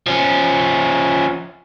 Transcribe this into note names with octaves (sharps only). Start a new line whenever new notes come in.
F3 C#4